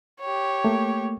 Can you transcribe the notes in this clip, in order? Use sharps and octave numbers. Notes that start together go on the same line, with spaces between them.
G4 C#5
A3 A#3